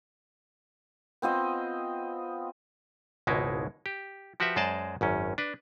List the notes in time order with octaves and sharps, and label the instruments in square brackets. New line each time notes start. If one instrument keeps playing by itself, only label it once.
[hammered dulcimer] B3 C4 F4 D#5
[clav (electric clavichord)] G#1 C#2 B2 G#3 D#4 E4
G4
F3 F#4 G4 B4 E5
F#2 G#3 C5 D5 D#5 A5
G#1 F#2 C#4
D4 B4